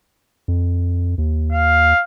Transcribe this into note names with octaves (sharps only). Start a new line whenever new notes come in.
F2
D#2
F5